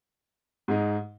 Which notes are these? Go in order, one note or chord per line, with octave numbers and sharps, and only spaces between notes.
G#2 G#3 D#4